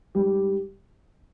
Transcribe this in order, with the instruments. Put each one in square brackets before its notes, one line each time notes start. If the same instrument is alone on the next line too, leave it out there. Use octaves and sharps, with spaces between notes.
[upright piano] G#2 G3 G4